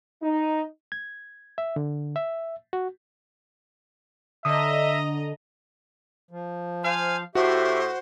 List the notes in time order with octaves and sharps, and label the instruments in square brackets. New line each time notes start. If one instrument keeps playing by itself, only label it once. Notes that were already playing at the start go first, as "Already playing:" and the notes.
[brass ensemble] D#4
[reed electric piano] G#6
E5
D3
E5
F#4
[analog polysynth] D3 [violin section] D#5 A#5 [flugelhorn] E5 [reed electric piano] D#6
[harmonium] F3
[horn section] C5 F5 [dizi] G#5
[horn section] A2 [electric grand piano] F#4 [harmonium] G4 E5 [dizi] C5